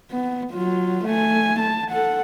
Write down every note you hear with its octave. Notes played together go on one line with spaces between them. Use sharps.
B3
F#3 F4
A3 G#5
A5
A4 F#5